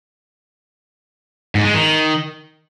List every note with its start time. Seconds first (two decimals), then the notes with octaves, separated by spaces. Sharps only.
1.55 G#2
1.64 G#3
1.74 D#3